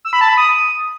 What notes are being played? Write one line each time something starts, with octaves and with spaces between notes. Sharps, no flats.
E6
B5
A5
B5
D#6